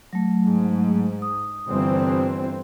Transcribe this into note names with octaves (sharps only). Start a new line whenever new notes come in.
F#3 A3
G#2
D#6
G1 E3 C4